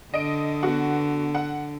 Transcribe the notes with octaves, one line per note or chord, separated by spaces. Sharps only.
D3 D#5 D7
B3 F#4 F#5
F#5